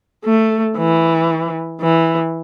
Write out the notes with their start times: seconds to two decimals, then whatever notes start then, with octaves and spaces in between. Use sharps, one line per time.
0.25 A3
0.77 E3
1.81 E3